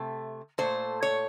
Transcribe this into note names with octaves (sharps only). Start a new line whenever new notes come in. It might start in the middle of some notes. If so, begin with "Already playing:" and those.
Already playing: C3 A3
A#2 A3 C5
C#5